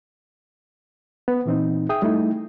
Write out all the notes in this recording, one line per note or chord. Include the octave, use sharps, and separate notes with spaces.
B3
A#2 E3 C4 D#4
G#4 E5 G5 D#6
G3 A3 D#4 E4